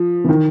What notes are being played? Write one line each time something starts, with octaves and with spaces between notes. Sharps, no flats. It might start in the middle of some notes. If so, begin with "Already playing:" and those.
Already playing: F3
E3
D#3